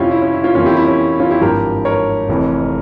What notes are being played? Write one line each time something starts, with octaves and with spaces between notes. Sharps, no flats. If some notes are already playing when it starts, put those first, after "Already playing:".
Already playing: F2 C3 G3 C4 C#4 E4 F4 G4
E4
C#4
E4
C#4 F4
F2 E3 G3 A#3 C#4 F4
E4 G4
E4
C#4
E4
C#4 F4
E4 G4
G#1 G2 F3 G4 A#4
A#4 C#5
F1 F2 E3